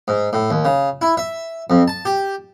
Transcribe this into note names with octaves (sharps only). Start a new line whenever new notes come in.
G#2
A2
D#2
C#3
E4
E5
F2
A5
G4